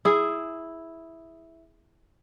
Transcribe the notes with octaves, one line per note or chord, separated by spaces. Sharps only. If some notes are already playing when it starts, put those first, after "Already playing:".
E4 G#4